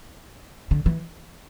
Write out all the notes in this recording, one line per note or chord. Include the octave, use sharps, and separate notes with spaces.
D3
E3